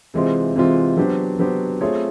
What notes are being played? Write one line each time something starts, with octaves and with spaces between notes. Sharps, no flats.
C3 E3 G#3 C4 F4
C3 E3 G#3 C4 F4
F#3 B3 D4 G4 C5
F#3 B3 D4 G4 C5
A3 C4 F4 G#4 C#5